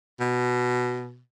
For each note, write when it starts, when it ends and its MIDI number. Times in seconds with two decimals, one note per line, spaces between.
0.20 1.20 47